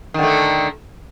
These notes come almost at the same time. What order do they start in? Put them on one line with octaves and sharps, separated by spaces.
D#3 D3 A3